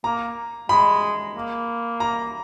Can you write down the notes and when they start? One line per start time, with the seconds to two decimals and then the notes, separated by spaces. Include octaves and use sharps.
0.04 A#3 A#5
0.69 G#3 B5
1.35 A#3
2.00 A#5